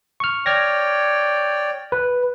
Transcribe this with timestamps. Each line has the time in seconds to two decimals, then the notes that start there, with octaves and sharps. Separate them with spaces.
0.20 C#6 F6
0.46 C#5 D5 G5 F6 G#6 A#6
1.92 B4